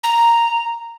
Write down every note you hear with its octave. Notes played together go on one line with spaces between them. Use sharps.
A#5